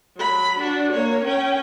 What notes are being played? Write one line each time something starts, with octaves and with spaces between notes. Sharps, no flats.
F#3 B5
D4 F#4
A#3 C#5
C#4 G5